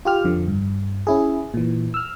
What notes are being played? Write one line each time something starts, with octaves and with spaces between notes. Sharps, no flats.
F4 G4 F6
F2 D3 F3
G2
C#4 E4 G#4
A#2 E3
E6 F6